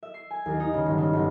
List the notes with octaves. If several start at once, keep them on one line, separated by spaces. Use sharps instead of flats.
E5
C7
G#5
D#2
D#4
C#3
G1
C#3
G1